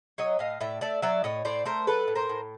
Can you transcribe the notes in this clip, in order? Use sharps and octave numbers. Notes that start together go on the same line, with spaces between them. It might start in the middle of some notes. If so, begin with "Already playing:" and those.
F#3 C#5 D#5
A2 D#5 F5
A2 D5 E5
A3 D5 E5
F#3 D5 E5
A2 C#5 D#5
A2 C5 D5
A3 A#4 C5
F#3 A4 B4
A2
A#4 C5
A2